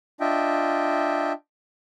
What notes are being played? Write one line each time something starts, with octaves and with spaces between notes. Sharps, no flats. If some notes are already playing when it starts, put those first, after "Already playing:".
D4 F4 D#5 E5 G5